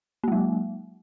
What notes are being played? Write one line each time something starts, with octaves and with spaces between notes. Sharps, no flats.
F#3 G#3 A#3